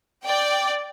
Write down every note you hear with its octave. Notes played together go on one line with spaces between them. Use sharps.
D5 G5